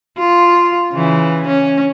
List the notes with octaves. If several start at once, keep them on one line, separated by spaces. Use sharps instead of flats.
F4
C#3 E3
C#4